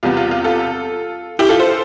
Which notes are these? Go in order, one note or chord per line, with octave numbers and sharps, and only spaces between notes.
E2 C3 G3 B3 F4
F4
F4
F4 A4
E4 G4
F4 A4
A4 C5